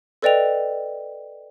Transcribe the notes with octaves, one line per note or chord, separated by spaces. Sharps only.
A4 B4 D5 D#5 G5 F7